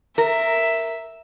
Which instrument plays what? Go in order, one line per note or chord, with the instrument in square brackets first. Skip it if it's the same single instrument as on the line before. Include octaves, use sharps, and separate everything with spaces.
[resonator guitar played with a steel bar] A#4 [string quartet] E5